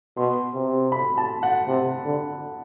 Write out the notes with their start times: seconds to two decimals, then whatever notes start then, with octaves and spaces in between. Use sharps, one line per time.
0.17 B2 C6
0.54 C3
0.92 B5
1.18 A5
1.43 F#5
1.68 C3
2.05 D3